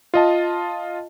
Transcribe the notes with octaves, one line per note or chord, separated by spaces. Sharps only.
F4 D#5 A5